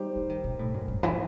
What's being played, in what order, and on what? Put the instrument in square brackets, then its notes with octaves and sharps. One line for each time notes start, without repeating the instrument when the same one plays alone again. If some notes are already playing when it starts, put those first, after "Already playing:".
Already playing: [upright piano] G3 D#4 G4 C5
[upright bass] E3
D#3
B2
A2
F#2
G2
E3